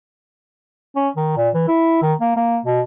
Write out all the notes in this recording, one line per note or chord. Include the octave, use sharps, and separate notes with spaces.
C#4
D#3
A#2
E3
E4
D#3
A#3
A#3
B2